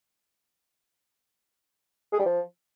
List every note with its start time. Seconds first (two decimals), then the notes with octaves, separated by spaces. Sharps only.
2.13 G#4
2.19 G3
2.26 F3